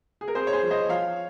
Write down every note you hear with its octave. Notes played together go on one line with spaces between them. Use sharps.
G#4
A#4
C4 G#4 C5
C#5
G#4 C5
F3
C5 D#5
F3 C#5 F5